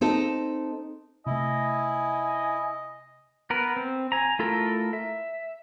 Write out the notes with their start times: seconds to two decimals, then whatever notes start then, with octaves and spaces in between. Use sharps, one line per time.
0.01 C4 D#4 A4
1.26 C3 A3 E4 D#5 G#5
3.50 B3 A#4 B4
3.76 C4
4.12 G#5 A#5
4.39 A3 E4 F4 A4 A#4
4.93 E5